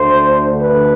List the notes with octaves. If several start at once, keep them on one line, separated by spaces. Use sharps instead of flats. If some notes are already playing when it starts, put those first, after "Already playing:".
Already playing: D2 D3 A3 C5
B4